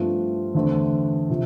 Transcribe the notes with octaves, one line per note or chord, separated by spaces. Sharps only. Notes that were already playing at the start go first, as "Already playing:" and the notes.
Already playing: G2 F3 A3 C4 F4
E2 D3 A3 C4
C3 F3